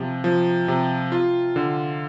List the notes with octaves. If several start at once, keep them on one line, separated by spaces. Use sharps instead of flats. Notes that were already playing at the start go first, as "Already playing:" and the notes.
Already playing: C3 F3
F3
C3
F4
D3